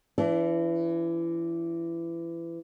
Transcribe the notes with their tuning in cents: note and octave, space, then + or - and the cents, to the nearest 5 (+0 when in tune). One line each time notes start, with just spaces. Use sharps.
E3 +25 D4 -30